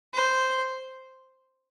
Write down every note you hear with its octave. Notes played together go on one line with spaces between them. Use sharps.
C5